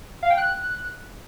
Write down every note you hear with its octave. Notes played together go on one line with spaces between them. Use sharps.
F5
G5
F#6